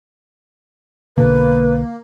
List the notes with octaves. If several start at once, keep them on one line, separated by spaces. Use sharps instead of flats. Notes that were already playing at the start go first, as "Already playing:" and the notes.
B1 B2 D3 A#3 B4